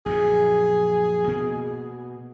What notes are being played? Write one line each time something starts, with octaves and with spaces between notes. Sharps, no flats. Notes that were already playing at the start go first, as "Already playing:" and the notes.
A#1 F#2 A#2 G#4
B2 A#3